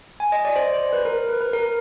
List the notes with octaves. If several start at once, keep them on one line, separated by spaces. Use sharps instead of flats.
G#5
D#5
D5
C5
C5
B4
A#4
B4
B4
A#4